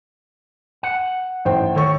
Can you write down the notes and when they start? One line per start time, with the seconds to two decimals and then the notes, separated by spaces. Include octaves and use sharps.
0.83 F#5
1.45 A1 C5 G5
1.76 D#3 A4 C#5 C#6